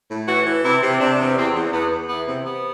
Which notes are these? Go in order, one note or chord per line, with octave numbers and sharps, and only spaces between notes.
A2
E3 F#4
E3
C3 E4
C3
C3 D4
E2
E2 C4
E2
E2 B3
E2
E3 B3
C3
C3 B3